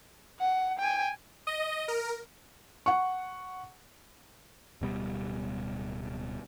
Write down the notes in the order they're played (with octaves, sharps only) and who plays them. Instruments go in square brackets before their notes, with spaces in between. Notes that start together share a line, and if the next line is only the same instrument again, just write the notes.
[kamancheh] F#5
G5 G#5
[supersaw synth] D#5
A#4
[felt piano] F#5 C#6
[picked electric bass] D1 B2 G3